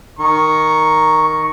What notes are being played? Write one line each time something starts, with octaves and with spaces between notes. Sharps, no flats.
D#3 A#5 C#6